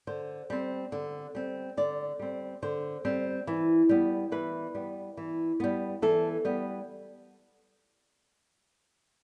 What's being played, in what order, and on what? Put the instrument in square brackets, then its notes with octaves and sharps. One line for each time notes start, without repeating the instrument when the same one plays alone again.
[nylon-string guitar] D3 C5
G3 C4
D3
G3 C4
D3 D5
G3 C4
D3 C5
G3 C4
E3
G3 B3
E3 B4
G3 B3
E3
G3 B3
E3 A4
G3 B3